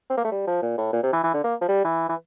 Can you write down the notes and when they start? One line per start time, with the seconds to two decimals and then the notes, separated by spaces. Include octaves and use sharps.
0.10 C4
0.17 A#3
0.24 A3
0.31 G3
0.47 F3
0.62 A#2
0.77 A2
0.93 A#2
1.03 C3
1.13 E3
1.23 E3
1.34 D3
1.44 A#3
1.61 F3
1.69 G3
1.85 E3
2.09 E3